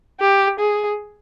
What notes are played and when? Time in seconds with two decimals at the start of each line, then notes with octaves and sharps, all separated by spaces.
0.20 G4
0.59 G#4